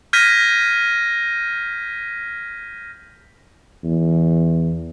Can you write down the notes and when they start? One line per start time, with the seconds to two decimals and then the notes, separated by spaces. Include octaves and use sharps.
0.13 F6 G6 G#6 A#6 B6 D#7
3.84 E2